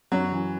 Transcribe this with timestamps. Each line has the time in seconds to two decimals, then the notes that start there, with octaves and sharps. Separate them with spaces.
0.12 F#2 F#3
0.32 E3